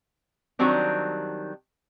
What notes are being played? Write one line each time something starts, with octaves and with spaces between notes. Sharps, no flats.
D#3 F#3 G3 C4 D4